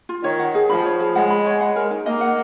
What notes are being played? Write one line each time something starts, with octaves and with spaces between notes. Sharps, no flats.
F4
D#3 C#5
F#5
G#4
F3 B5
C#5
G#4
G#3 F#5
B5
C#5
F#5
A#4
D#4
A#3 D#5
F#5